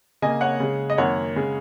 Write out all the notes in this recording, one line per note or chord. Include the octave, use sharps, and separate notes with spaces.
C#3 A#3 D#5 G#5
C#5 F#5
C#3 G#3
D#5
F#2 D#3 A#3 C#5 F#5
C#3 G#3